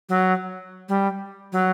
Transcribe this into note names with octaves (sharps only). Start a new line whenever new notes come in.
F#3
G3
F#3